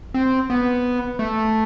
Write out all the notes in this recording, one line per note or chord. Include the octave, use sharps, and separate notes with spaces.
C4
B3
A3